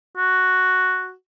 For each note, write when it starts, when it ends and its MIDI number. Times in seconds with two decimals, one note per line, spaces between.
0.17 1.13 66